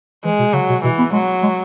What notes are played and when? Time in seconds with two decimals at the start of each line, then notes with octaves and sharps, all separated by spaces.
0.24 E3 G#3
0.39 B2
0.53 C#3 F#3
0.69 B2
0.84 B2 E3
0.99 B3
1.13 F#3 G#3
1.43 G#3